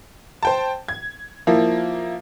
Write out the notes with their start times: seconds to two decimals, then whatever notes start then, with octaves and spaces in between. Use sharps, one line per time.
0.43 C5 G5 A5
0.88 G#6
1.47 F3 A#3 E4